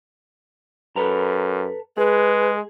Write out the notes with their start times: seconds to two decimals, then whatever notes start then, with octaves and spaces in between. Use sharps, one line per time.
0.96 F#2 A4 B4 A#5
1.97 G#3 G#4 B4